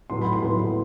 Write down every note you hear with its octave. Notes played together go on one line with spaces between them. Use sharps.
A2 F#3 B3 C6
B5
C6
A2 F#3 B3